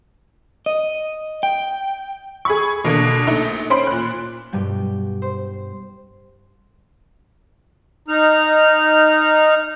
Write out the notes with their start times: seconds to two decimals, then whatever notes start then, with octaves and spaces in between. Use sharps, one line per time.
0.66 D#5
1.43 G5
2.45 G#4 B5 C#6
2.85 B2 D3 A#3 D4
3.27 A#1 A3 D#4
3.70 C#4 C5 B5 C6 D7
3.87 A#2 F#6
4.53 G2 B2 G3 G5
5.22 C5
8.08 D#4 F6